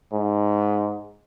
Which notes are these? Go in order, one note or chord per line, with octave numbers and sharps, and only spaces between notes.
G#2